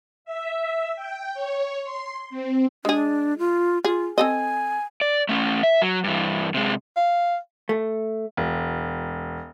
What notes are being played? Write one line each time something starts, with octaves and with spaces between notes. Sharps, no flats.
E5
G5
C#5
C6
C4
G#3 D4 G#4
F4
F4 G#4
C4 A4 D#5 G#5
D5
A3 C#4
E5
F#3
G2 E3
C3 G#3
F5
A3
E1